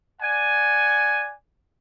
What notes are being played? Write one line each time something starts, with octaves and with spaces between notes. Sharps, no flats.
D5 F#5 G#5